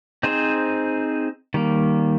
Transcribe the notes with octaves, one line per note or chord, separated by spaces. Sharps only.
C4 D#4 G#4 C5
D#3 G3 A#3